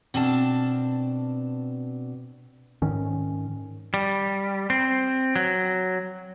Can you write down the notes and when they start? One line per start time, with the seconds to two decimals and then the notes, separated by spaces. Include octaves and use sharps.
0.14 B2 C4 D4 G#5 A5
2.82 G#2 D#3 C#4
3.94 G3
4.70 C4
5.36 F#3